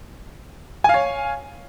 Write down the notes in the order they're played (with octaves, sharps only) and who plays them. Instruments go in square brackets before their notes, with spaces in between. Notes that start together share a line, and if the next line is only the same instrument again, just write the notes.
[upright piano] G#5
F5
C#5